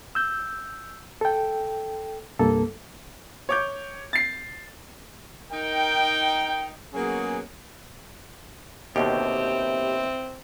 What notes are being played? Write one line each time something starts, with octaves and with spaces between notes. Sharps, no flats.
E6 G6
A4 G5
C2 G2 A#3 A4
C#5 D6 G6
A6 C7
D#4 A#4 G5
F#3 A#3 B3 C#4 G#4
D#2 B2 D3 C4 E4 G4